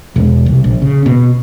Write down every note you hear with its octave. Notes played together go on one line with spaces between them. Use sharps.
E1
C2
A#1
C#3
B2